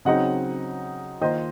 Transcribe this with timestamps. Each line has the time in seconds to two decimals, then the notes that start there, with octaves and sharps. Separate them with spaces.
0.05 C#3 F#3 C4 D#4 D#5 F#5
1.21 D#3 A#3 F4 C5 D#5